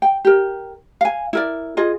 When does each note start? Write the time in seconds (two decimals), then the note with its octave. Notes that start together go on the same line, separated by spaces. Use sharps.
0.02 G5
0.25 G4 A#4
1.01 F5 G#5
1.33 E4 A#4 D5
1.77 F4 G#4 D#5